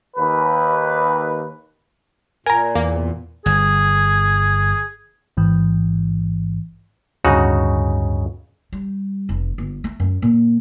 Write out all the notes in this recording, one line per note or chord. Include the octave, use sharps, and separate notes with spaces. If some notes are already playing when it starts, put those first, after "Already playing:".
D#2 B4
A#2 A#4 G#5 A#5
E2 A#3
G1 G#4
A1 G#2 E3
D1 D2 G2 C#3 D#4 F#4
G3
F1
G1
A3
F#2
A#2